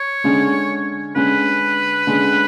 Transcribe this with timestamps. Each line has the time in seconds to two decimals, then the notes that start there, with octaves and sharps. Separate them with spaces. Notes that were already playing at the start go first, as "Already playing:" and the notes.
Already playing: C#5
0.24 D3 G#3 C#4
1.16 D3 G#3 C#4 B4
2.07 D3 G#3 C#4